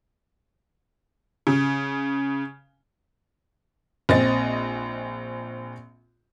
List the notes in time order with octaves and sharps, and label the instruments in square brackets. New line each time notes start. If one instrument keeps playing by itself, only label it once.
[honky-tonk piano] C#3
A#1 C4 D#5 A6